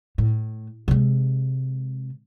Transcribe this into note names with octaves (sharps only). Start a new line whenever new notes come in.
A2
C3 G#3